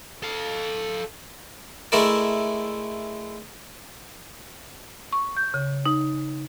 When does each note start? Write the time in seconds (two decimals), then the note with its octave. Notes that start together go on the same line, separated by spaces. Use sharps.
0.23 A4 F5
1.92 G#3 A3 E4 A#4 D5
5.12 C#6
5.37 G6
5.54 C#3
5.85 D#4